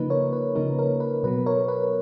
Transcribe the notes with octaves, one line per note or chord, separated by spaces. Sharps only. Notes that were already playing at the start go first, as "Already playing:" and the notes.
Already playing: C#3 F3 A#3 D#4 B4
A#4 C#5
B4
C#3 F3 A#3 D#4 A#4
A#4
B4
B2 F#3 B3 B4
A#4 C#5
B4